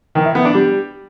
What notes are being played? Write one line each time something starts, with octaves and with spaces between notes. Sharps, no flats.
D#3
E4
B3
D4
G3